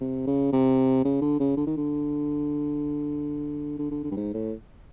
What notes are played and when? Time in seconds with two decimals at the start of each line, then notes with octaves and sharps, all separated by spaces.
0.01 C3
0.27 C#3
0.53 C3
1.05 C#3
1.22 D3
1.40 C#3
1.57 D3
1.67 D#3
1.77 D3
3.79 D3
3.91 D3
4.04 D3
4.11 G2
4.17 G#2
4.34 A2